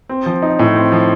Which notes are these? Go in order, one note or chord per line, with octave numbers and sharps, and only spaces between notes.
C4
F3
D#4
A2
C4
F3